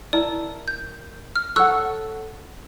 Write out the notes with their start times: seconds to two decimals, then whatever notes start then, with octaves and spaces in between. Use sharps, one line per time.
0.13 E4 A#4 D5 A5
0.68 G6
1.36 F6
1.56 A4 C#5 F#5 C#6 E6 F#6